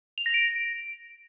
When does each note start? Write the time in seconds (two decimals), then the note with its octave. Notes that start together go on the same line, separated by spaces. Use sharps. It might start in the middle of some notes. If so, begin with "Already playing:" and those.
0.18 F7
0.26 A#6
0.34 D7